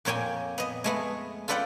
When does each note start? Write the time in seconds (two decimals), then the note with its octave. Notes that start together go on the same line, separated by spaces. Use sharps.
0.05 F2 A#2 C#5 G5 G#5
0.58 B3 D#5
0.84 G#3 A3 B3
1.48 F4 A4 B4 D5 F#5 G5